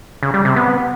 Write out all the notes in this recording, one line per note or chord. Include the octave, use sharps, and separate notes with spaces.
C#3
G3
C3
B3